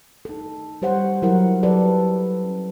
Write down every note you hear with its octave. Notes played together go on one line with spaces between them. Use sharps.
D#4 A4
G3 G4 C5 C#5 F#5
F#3 E4 A#4 F#5
F#3 G4 A4 B4 D5
C#4